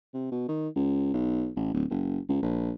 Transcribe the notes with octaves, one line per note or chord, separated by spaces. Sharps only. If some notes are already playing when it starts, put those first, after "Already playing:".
C3
B2
D#3
C#2
B1
A1
D1
F#1
C#2
A#1